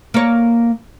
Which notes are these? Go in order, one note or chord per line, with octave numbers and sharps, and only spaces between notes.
A#3 C#5